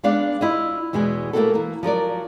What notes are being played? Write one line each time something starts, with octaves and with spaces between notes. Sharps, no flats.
G#3 B3 D4 D5 F5 F#5
E4 F4 D#5
E2 B2 G#3 E4 G#5
A3 A#3 C4 E4 F#4 A4
E3 A#3
F3 F#3 A#4 D5